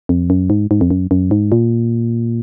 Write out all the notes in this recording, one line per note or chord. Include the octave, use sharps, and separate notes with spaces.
F2
F#2
G#2
G#2
F2
F#2
F#2
G#2
A#2